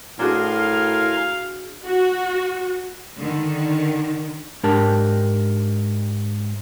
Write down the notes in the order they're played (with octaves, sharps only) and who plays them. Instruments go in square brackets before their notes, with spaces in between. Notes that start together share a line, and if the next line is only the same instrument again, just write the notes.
[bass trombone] A2 [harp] D4 F#4 G#4 [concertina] A#4 G#5 C6 [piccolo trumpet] F5
[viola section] F#4
[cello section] D3 D#3
[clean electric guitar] G#2 D4 G4 A#4 G5 A5